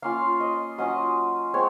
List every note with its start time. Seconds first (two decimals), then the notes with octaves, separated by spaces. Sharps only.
0.02 A#3 C#4 F4 F5
0.40 D#5
0.78 F#3 C#4 F4 D#5
1.54 G#3 C4 C#5